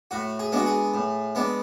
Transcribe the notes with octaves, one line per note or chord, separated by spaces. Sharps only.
A2 F#4
G#4
G#3 B3 D4 F#4
G#4
A2
G#3 B3 D4